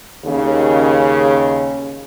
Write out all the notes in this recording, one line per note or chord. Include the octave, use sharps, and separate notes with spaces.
D#2 C#3